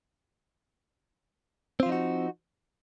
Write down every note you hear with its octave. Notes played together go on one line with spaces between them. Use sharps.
F3 C4 D#4 F4 F#4